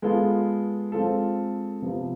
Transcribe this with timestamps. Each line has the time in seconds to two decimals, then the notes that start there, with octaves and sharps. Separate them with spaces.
0.02 G#3 B3 F4 A4
0.92 G#3 C4 F4 A4
1.82 C3 F3 B3